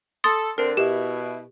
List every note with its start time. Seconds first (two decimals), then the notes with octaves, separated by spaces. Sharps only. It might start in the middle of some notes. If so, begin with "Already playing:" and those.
0.24 A4 C6 D#6 A6
0.58 D3 C4 D4 A#4
0.77 B2 E4 G4 E7